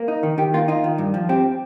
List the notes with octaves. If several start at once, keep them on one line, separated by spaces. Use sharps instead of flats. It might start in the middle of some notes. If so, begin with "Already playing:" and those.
Already playing: A#3
D#4
D#3
D#3 G4
A#3 F4
D#4 F4
D#3
G2
F3
C4 G4